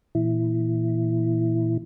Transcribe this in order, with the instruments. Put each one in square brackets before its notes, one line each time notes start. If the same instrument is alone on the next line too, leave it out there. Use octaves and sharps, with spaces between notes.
[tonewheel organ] A#2 E3 E4